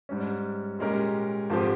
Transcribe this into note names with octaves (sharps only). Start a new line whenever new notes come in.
G#2 G3 C#4
A#2 G#3 C#4 G4 A#4
G#1 F3 C4 G4